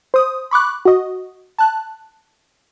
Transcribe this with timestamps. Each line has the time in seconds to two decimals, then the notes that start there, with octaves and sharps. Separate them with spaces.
0.14 C5 D#6
0.51 B5 C#6 D6 F#6
0.85 F#4 D#5
1.58 A5 F#6